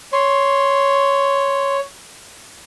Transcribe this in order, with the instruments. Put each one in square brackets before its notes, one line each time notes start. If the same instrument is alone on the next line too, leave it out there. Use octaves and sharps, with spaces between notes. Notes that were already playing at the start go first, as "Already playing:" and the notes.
[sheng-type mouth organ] C#5 [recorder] C6